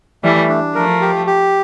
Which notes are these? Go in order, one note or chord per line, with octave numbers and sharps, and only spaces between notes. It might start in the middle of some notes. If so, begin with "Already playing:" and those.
E3 G3 A3
D4
F3 A3 A#4
G4
G4